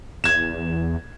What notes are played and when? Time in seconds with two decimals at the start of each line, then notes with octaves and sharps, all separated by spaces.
0.24 E2 G#6 E7